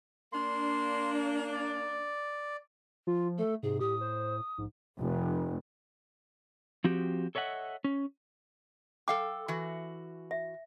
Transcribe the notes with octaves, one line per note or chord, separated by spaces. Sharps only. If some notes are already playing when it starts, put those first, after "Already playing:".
A#3 D4 C6
D5
F3 F4
A3 A4
G#2 C3 G#4
A2 G4 D#6
C5
A#1 G#2
F1
F3 C4 F#4 G4
A4 C#5 D#5 E5 F#5
C#4
A4 F5 G5 D6
E3 F#4
E5